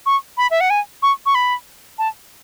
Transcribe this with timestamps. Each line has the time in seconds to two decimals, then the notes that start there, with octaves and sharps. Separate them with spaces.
0.06 C#6
0.37 B5
0.51 E5
0.61 F#5
0.70 G#5
1.03 C#6
1.26 C#6
1.35 B5
1.98 A5